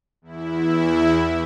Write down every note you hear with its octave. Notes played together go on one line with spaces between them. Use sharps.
E2 E4